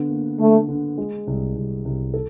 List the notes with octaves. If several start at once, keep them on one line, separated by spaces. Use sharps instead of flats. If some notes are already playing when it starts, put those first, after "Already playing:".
Already playing: D3 B3
A#3
D3 A3
D3
G#3
C2
C2
C2
A4